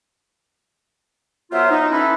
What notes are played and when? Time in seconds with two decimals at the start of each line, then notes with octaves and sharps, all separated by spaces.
1.52 F#3 B3 F4 A#4 C5 E5
1.70 D#4
1.91 E3 C#4 E4 A4 B4